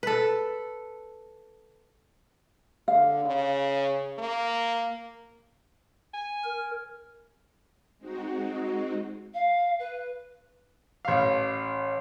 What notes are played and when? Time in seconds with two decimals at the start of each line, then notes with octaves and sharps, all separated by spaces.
0.03 A4 B4
2.88 D3 F5
3.25 C#3
4.19 A#3
6.13 G#5
6.44 A#4
7.99 G#3 C4 D#4 F#4
9.34 F5
9.79 B4
11.05 A1 F5